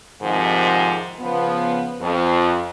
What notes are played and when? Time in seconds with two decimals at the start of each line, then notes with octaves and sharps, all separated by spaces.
0.21 F2 G#2 C3 D#3 F3
1.19 C#3 F3 B3
2.01 F2